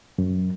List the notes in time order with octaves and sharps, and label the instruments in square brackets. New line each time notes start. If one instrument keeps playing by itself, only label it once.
[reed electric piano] F#2